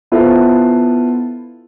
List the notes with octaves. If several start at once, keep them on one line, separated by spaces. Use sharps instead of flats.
B3 E4 F4 A4 C5